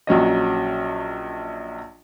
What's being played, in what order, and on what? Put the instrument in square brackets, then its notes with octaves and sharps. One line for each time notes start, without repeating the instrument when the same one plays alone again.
[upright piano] A#1 F#3 C#4 D#5